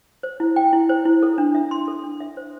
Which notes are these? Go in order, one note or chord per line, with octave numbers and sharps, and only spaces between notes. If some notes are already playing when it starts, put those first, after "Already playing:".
C5
E4
G5
E4
C5
E4
A4
D4
E5
C6
A4
D4
E5
C5